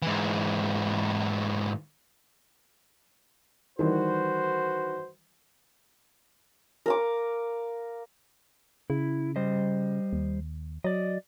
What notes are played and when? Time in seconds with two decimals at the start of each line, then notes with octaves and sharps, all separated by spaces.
0.02 G#2 E3
3.79 D#3 E3 G3 F#4 B4 C5
6.86 A#4 F5 D6
8.90 C#3 E4
9.36 G3 C5 D#5
10.13 D#2
10.84 F#3 D5 D#5